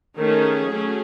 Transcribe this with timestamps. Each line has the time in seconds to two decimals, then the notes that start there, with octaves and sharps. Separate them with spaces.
0.18 D#3 A3 C#4 G#4
0.69 F#3 A3 C#4